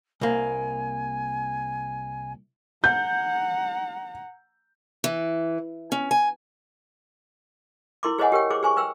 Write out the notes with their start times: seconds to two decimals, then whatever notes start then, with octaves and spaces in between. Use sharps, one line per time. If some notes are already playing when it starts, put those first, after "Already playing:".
0.21 C2 A#3 G#5
2.84 F#5 A#5 G6
5.04 E3
5.92 C#4
6.11 G#5
8.03 E4 A#4 C6 D6
8.18 G#4 C5 C#5 D#5 F#5 G#5
8.32 G4 A#4 C#5 G5
8.50 G#4 C5 D6
8.63 G#4 C5 G#5 C#6
8.77 B4 C5 G5 E6